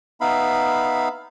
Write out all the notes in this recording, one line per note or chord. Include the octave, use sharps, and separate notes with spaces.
B3 D#4 E5 F5 B5